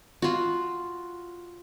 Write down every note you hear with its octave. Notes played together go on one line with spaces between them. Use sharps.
F4 F#4